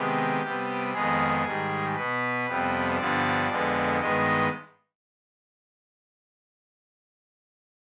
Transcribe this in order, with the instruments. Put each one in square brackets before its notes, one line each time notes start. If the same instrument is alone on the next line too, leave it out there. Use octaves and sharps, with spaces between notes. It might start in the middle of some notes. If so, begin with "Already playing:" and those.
Already playing: [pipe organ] C3 D#3 G#3 B3 G4
C3 G3 B3
F2 D#3 G#3 B3 G#4
G#2 D#3 G3
B2 B3 B4
F2 C3 G3 B3
G2 D3 F3 B3 D5
F2 D3 G#3 B3
G2 D#3 G#3 B3 D#5